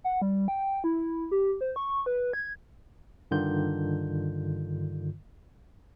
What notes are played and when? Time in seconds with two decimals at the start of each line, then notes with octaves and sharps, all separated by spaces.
0.04 F#5
0.22 G3
0.48 G5
0.84 E4
1.31 G4
1.61 C5
1.76 C#6
2.06 B4
2.33 G#6
3.31 G2 D3 D#3 F4 G6